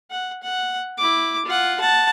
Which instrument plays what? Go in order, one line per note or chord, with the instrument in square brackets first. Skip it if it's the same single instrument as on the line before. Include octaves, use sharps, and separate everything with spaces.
[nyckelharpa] F#5
F#5
E4 D6
F4 F#5
F#5 A5